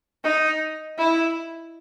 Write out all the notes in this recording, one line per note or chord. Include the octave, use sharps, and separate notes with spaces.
D#4
E4